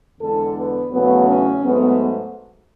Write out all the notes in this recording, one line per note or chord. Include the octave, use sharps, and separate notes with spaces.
E2 D3 G#3 A4
B3
E2 C#3 F#3 A3 B3
C#4
G#2 F#3 A3 B3